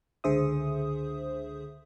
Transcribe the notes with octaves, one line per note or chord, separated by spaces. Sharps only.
C#2 D3 G#4 C5 E5 D#6